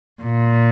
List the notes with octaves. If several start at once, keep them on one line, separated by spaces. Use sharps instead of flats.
A#2